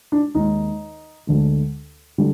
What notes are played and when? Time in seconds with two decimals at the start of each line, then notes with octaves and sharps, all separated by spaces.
0.12 D4
0.35 D#2 D#3 G#3 D#4
1.27 D2 D3 G#3
2.18 D3 G3